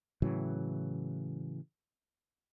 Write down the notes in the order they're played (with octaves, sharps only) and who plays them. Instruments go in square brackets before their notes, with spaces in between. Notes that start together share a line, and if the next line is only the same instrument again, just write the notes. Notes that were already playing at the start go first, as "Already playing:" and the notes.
[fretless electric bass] A2 C#3 E3 F#3